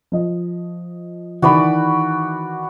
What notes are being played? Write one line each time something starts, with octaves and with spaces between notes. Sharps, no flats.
F3 D#5
D#3 E3 F#4 D5 B5